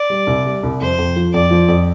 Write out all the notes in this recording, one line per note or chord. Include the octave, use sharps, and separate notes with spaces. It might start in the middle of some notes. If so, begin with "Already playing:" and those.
Already playing: D5
G3
C2
G3
C2
F2 C5
F2
F3
F2 D5
F3
F2